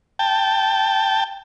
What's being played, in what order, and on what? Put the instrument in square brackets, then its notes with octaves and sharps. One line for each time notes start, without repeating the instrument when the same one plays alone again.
[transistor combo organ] G5 A5